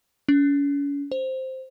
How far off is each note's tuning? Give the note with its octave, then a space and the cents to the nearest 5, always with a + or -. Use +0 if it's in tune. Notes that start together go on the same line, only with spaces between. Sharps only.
C#4 +40
C5 +0